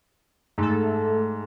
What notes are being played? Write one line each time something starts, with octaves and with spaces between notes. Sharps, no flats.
G#2 A3 A4